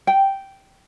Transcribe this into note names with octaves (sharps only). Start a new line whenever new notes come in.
G5